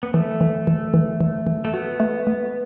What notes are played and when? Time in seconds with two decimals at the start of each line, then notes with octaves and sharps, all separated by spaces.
0.03 B3
0.13 E3 A3
0.41 E3
0.67 E3
0.94 E3
1.21 E3
1.47 E3
1.65 A3
1.73 B3 F#4
2.00 A3
2.27 A3